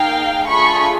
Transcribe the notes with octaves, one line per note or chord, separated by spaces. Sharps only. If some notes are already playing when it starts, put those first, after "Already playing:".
Already playing: A#3 D#4 G#4 F5 G5
A3 D4 F4 G#4 B5 C#6